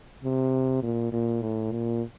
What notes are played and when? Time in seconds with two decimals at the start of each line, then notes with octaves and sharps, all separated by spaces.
0.24 C3
0.83 A#2
1.12 A#2
1.42 A2
1.72 A#2